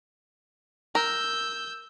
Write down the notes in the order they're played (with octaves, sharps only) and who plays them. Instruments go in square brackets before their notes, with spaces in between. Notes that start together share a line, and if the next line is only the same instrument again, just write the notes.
[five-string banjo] A#4 [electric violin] E6 G6